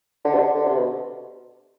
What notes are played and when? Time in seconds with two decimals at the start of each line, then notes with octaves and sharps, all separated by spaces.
0.24 D3
0.34 C3
0.39 D3
0.55 D3
0.66 C3
0.76 B2